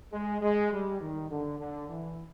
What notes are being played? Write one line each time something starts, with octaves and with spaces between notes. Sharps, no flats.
G#3
G#3
G3
D#3
D3
D3
E3